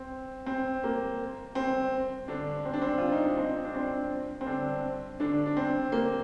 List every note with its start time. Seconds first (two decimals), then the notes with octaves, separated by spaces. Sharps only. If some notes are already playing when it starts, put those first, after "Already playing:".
Already playing: C4
0.46 C4
0.84 A#3
1.55 C4
2.28 D3 D4
2.65 C4
2.73 D4
2.81 C4
2.98 F4
3.12 D#4
3.25 D4
3.38 C4
3.65 D4
3.75 C4
4.41 C4
4.46 D3 D4
5.20 D3 D4
5.46 D4
5.57 C4
5.92 A#3